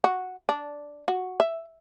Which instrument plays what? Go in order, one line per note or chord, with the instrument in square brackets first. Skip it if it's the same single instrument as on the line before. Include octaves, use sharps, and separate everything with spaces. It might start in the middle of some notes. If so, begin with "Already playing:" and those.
[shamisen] F#4
D4
F#4
E5